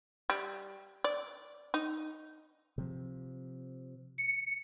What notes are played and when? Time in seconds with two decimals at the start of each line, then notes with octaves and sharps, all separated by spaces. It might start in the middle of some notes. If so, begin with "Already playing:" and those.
0.30 G3
1.04 D5
1.74 D#4
2.78 C3 F3
4.18 C#7